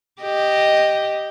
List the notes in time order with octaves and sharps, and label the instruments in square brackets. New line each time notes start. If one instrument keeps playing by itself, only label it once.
[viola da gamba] G4 D#5